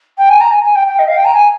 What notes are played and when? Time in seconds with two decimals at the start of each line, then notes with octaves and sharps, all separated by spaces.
0.18 G5
0.29 G#5
0.41 A#5
0.52 G#5
0.64 G#5
0.75 G5
0.88 G5
0.99 D#5
1.08 F5
1.16 G5
1.25 A#5
1.34 G#5